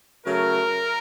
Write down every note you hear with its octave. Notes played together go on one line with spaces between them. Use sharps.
C#3 F#3 A3 A#4